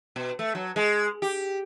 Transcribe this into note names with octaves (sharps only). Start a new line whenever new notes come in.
B2
A3
F#3
G#3
G4